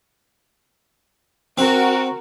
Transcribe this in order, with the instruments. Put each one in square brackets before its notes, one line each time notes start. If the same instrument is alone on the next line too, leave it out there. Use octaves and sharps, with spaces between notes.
[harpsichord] C4 [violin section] F#4 A#4